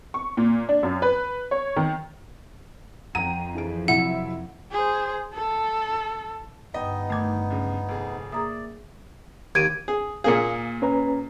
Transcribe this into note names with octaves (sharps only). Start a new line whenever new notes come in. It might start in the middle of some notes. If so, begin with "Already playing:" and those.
C#6
A#2
D4
F#2
B4
C#5
D#3
F2 F#5 G5 A#5 D#7
E3 G#4 D7
C3 F#3 E4 F#5
G#4 C5
A4
G1 G2 B3 D#4 D#5 G5
D#3 A3 D6 G#6
C#2 C#3
F1 G#4
A#3 G#4 D5 E5 A#5 D#6
D#2 G#6 D7 D#7
G#4
A#2 A#3 G#4 F5 C#7
C#4 B4 A#5